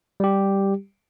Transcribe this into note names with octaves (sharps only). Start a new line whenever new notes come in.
G3 G4